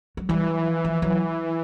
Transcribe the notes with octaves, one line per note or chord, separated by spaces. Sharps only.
F#3
E3 G3
F#3
F3
F3
E3 F#3